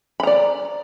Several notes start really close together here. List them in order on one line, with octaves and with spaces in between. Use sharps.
B5 A#5 D5